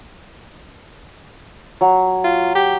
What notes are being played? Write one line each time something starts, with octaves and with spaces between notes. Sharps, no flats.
F#3
F4
G4